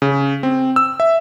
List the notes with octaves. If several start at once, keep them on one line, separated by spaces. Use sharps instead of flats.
C#3
C4
E6
E5